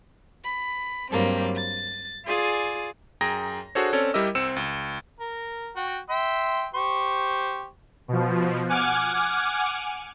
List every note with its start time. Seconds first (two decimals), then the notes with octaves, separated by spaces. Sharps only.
0.43 B5
1.11 G2 F#3 G3 A#3 C4
1.54 A6
2.26 F4 G#4 D5 G#5
3.21 F#2 G#4 G5 A#5 A#6
3.75 D4 F#4 G#4 A4 C5 C#5
3.93 C4 C#4 A4 C#5 D5
4.14 G3 E4 G4 A#4 D#5 E6
4.35 C2 C4 E6 C#7 E7
4.56 C#2
5.20 A#4
5.76 F#4 G5
6.10 E5 G5 C6
6.75 G4 C5 C#6
8.08 B2 F3
8.69 F#5 G#5 D6 F6